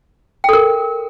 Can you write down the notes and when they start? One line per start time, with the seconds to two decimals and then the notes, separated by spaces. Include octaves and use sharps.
0.44 G5
0.49 A4
0.53 A#4